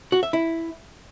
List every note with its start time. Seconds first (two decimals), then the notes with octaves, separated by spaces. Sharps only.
0.12 F#4
0.23 E5
0.33 E4